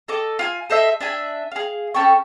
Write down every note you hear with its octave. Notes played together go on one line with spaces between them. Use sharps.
A4 D#5 D6
F4 G#5
A4 C5 D#5 E5
D4 E5 G#5
G#4 F5
C#4 A4 G5 C#6